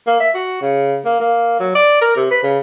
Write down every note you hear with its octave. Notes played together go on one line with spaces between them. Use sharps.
A#3
E5
F#4
C#3
A#3
A#3
F#3
D5
A#4
C3
B4
C#3